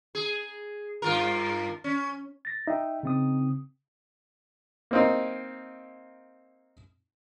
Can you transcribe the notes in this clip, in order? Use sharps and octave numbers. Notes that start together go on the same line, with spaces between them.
G#4
G2 F4 A#4
C#4
A6 A#6
D#4 E5 G5
C#3 C4 D#6
A#3 C4 D#4